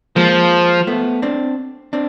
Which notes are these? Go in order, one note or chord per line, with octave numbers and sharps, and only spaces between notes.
F3 G#3 A#3
A3 B3
C4 D4
C4 D4